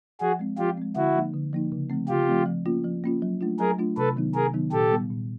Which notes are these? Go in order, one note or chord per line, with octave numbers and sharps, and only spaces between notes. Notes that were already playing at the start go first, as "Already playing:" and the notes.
F3 F#4 G#4
G#3 C4
F3 F4 G4
G#3 C4
D3 E4 F#4
F3 A#3 D#4
D3
F3 A#3 D#4
C#3
F3 A3 C4
C#3 F4 G4
F3 A3 C4
F3
A#3 C#4 F4
F3
A#3 C#4 F4
F#3
A3 D4 F4
F#3 G#4 A#4
A3 D4 F4
C3 A4 B4
D#3 F#3 B3 D#4
C3 G#4 A#4
D#3 F#3 B3 D#4
A#2 G4 A4
G3 B3
A#2